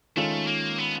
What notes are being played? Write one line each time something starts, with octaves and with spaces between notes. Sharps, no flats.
D#3 G#3 A3 C#4 F4 A4
A#3
B3